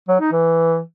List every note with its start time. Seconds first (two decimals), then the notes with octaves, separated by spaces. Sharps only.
0.08 F#3
0.20 D#4
0.32 E3